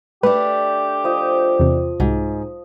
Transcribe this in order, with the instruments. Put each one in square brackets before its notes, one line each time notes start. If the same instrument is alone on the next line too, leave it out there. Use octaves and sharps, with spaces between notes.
[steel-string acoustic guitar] A3 D4 [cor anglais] G4 [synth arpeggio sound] B4
[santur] F3 D#5
[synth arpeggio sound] E2 C3
[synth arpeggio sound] C2 F#4 [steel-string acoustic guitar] G#2